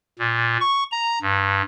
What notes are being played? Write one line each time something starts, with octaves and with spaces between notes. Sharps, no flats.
A#2
C#6
A#5
G2